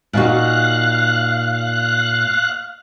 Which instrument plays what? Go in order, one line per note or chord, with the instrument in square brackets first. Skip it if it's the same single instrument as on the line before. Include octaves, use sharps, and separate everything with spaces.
[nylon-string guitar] A#2 D#4 F#4 [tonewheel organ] F5 F#6